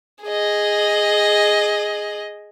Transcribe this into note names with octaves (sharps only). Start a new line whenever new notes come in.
G#4 D#5